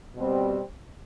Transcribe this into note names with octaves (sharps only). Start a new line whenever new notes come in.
B2 G3 C4